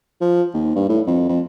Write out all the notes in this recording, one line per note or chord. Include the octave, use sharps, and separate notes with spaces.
F3
D#2
G2
A2
F2
F2